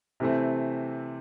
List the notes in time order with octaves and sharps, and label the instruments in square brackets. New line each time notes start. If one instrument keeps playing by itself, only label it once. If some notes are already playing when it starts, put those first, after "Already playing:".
[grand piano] C3 E3 A3 C4